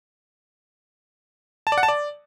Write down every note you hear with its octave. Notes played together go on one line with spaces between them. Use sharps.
A5
D5
F#5
A5
D5